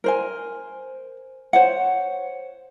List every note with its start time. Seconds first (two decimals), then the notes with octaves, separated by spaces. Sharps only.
0.04 A#4 C5 G#5
1.53 C5 C#5 F#5